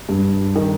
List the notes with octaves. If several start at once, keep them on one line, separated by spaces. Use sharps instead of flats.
G2
D#3